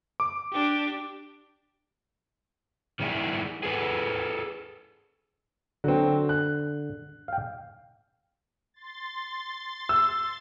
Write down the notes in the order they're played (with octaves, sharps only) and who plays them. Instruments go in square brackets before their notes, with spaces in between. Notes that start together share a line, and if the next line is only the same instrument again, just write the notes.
[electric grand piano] D6
[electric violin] D4 G4
[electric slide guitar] D#3 G3 A#3 D4 E4 G#4
G#4 A4 B4 G#5
[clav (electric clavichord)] D3 [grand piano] F#3 C4
[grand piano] F#6
[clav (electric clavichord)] F5 G5
[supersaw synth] C6 A6
[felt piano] E6